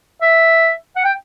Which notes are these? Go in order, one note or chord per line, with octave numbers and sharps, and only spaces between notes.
E5
F#5
G5